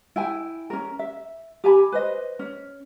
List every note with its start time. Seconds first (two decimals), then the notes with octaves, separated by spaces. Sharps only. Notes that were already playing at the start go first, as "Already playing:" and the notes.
0.16 E4 G5 G#5
0.70 C#4 A#4
0.99 E5
1.64 G4 G#5 A5 B5
1.92 B4 C5 D#5
2.39 C#4